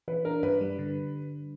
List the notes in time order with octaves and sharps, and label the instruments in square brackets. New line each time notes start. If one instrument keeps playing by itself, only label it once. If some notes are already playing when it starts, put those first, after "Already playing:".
[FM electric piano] E3 [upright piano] B4
[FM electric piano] D4 [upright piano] A#4
[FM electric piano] G2 [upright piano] B4
[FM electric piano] G3
D3